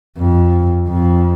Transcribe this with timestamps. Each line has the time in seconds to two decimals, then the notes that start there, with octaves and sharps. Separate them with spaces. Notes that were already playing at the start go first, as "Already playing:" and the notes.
0.18 F2
0.88 F2